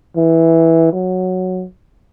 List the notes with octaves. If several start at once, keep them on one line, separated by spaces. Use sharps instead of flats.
E3
F#3